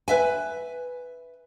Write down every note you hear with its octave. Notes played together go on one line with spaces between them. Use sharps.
B4 E5 G#5